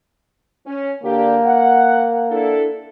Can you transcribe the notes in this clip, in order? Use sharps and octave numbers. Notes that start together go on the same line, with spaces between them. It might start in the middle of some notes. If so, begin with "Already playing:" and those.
C#4
D3 A#3 D4 G4
F#5
D4 E4 A4